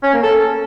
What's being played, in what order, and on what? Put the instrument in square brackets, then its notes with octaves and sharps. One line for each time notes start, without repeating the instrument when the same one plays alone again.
[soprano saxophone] C#4
A#3
A4